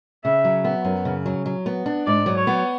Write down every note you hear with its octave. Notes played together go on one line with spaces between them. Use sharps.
C#3 E5
F#3
B3
F#2
C#3
F#3
F#3
B3
D4
G#2 D5
F#3
C#5
B3